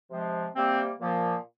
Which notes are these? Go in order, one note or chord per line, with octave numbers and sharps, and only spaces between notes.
C3 F3 G#3
C3 G3 A#3 C4
A#2 F3 A#3